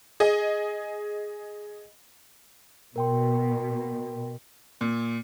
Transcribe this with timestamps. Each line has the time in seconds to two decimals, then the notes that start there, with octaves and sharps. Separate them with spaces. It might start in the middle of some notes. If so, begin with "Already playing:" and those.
0.20 G#4 D#5
2.96 B2 A#4 G5 C6
4.81 A#2